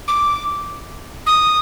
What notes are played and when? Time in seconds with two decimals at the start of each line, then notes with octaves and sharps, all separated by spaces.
0.07 D6
1.26 D#6